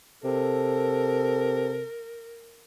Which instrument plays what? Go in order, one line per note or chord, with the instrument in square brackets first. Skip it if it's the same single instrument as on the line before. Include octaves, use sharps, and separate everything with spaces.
[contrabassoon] C3 [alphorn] A4 [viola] A#4